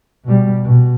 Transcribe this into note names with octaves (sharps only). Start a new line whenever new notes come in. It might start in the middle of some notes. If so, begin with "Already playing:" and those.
B2 G3
B2